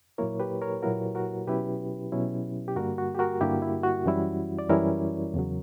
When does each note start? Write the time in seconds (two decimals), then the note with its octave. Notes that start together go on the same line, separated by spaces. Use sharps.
0.18 A#2 F#3 A#3 E4 A#4 C#5
0.40 G4 B4
0.62 A#4 C#5
0.82 A#2 F#3 A#3 E4 F#4 A#4
1.15 F#4 A#4
1.47 B2 F#3 C#4 E4 G4 B4
2.12 B2 F#3 C#4 E4
2.68 G4
2.76 G2 D3 G3 A#3 F#4 A#4
2.98 F#4
3.15 G4
3.19 F#4 A#4
3.41 G2 D3 G3 A#3 E4 G4
3.62 E4
3.83 F#4
4.05 F#2 E3 G3 C#4 E4
4.59 D5
4.70 F#2 E3 G3 C#4 E4 A#4 C#5
5.34 E2 C#3 F#3